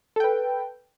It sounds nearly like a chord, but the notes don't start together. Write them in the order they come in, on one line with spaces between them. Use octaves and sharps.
A4 G5 B4